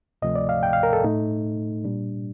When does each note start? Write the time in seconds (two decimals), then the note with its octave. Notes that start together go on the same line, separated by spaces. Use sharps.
0.22 D2 C3 F3 A3 D#5
0.35 D5
0.49 F5
0.63 G5
0.73 F5
0.83 A#4
0.93 A4
1.03 A2 A3 D#4
1.84 A#2 G3 D4